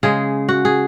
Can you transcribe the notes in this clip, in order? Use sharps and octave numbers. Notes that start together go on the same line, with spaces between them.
C#3 G#3 G#4
F#4
G#4